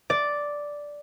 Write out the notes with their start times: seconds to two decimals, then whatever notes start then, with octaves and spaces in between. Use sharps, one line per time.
0.10 D5